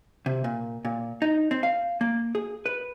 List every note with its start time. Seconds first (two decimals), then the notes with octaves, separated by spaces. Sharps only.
0.26 C3
0.44 A#2
0.85 A#2
1.22 D#4
1.51 C4
1.63 F5
2.01 A#3
2.35 G#4
2.66 B4